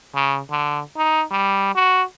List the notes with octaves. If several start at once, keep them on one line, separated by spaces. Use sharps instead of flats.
C#3
D3
D#4
G3
F#4